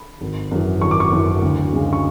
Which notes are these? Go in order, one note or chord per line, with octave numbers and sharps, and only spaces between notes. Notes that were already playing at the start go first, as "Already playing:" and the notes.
Already playing: B5
G#1
F#2 E3
G#1 C#6
D6
C#6
F#2 E3
D2
C#3 G#3
C#6